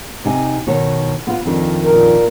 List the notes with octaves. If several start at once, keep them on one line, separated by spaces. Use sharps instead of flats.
C3 D#4 G#5
B2 D#3 C#5
B3 F4 B4
F2 D#3 D4
A#2 A#4